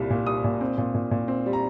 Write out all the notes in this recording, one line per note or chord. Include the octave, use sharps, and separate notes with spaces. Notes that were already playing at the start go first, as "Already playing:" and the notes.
Already playing: C2 A#2 G3
A#2
G3 D#6
A#2
C4
A#2
A#2
A#2
C4
G3
A#5